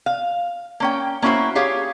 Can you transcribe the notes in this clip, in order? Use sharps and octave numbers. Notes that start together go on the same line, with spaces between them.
F5
A#3 C#4 G5
A#3 C#4 E4 F#4 C5
G4 G#4 C#5 F5